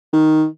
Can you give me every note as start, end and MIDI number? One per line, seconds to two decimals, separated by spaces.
0.13 0.45 51